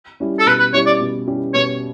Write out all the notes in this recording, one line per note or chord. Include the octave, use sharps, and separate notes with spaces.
G3 C#4 E4 G4
A4
B2 B4
B4
G3 C#4 E4 G4 C#5
D5
B2
G3 C#4 E4 G4
B2 C#5